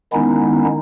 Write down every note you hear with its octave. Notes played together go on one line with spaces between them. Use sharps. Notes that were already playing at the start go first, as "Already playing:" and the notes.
D#3 G#3 B3 C#4 D#4 E4